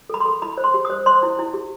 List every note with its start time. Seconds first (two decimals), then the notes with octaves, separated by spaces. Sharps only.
0.10 A4 B5
0.20 C6
0.26 A4
0.42 E4 B5
0.57 C5
0.64 C6
0.74 G4
0.85 D#6
0.90 C5
1.06 C5 C6
1.23 E4
1.39 E4
1.54 G4